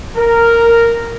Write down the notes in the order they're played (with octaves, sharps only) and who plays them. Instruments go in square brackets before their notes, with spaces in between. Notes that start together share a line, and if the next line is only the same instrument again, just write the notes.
[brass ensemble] A#4